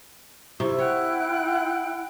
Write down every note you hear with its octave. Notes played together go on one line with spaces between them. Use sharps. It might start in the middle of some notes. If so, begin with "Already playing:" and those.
C3 E4 C#6
C#5 F#5 G5 F#6